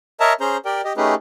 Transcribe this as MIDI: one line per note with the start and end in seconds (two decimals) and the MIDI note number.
0.20 0.33 70
0.20 0.33 73
0.20 0.33 75
0.20 0.33 76
0.20 0.33 81
0.20 0.33 82
0.40 0.57 61
0.40 0.57 68
0.40 0.57 72
0.40 0.57 82
0.40 0.57 91
0.65 0.81 67
0.65 0.81 70
0.65 0.81 74
0.65 0.81 79
0.84 0.93 67
0.84 0.93 75
0.97 1.15 57
0.97 1.15 61
0.97 1.15 63
0.97 1.15 67
0.97 1.15 68
0.97 1.15 71